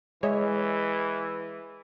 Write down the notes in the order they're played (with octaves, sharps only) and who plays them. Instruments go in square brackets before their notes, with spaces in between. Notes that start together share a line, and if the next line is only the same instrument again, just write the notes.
[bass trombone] E3 [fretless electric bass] G#3 [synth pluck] C#5 D#5 E5